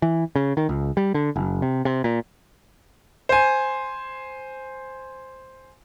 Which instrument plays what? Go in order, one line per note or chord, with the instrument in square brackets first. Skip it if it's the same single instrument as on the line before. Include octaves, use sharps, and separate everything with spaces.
[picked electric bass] E3
C#3
D#3
C#2
G3
D3
F#1
C3
C3
A#2
[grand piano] C5 G#5